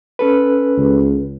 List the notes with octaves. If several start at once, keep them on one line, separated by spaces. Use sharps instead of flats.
C#4 A4 B4
C#2